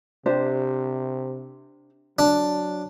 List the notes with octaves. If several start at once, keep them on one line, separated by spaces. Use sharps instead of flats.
C3 D4 G4 C5
F#3 D4